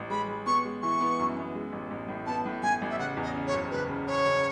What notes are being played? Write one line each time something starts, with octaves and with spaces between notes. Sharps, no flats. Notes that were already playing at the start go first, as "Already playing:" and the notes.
Already playing: A1
G#3 B5
G#3
B3 C#6
G#3
E3 C#6
B3
F#2
B3
G#3
A1
A1
A2
B3 A5
A2
A2 G#5
A1
E5
C#3 F#5
E2
D#5
C#3
C#5
F#1
F#1 B4
C#3
C#3 C#5
C#3